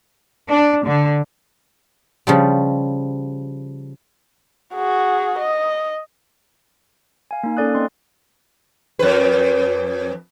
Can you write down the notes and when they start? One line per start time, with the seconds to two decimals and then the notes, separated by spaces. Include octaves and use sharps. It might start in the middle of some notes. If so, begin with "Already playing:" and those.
0.50 D4
0.87 D3
2.27 C#3 F3 G3
4.75 F#4 G#4
5.39 D#5
7.31 F5 G#5
7.43 A#3 D#4
7.57 A#3 C#4 A4 D5 D#6 F#6
7.75 C4 D#5 C6
8.99 F2 B4